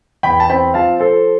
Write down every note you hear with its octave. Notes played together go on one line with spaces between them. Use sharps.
E2 G5 B5
A5
C4 G5 B5
F3 F5 A5
F3 A4 C5